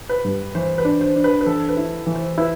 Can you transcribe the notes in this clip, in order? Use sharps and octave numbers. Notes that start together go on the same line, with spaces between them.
B4
G2
E3 C5
B4
D4
C5
D4
B4
B4
E3 A4
B4
E4
E3
C5
E4 B4